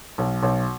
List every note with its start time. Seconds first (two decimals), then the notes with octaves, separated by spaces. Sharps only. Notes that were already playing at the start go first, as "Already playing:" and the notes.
0.18 B1
0.43 B1